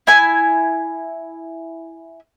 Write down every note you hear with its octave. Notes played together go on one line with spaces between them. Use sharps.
E4 G#5